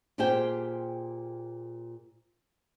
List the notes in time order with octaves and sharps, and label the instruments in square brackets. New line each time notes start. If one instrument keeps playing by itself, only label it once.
[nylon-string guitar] A#2 G4 G#4 C5 F5 G5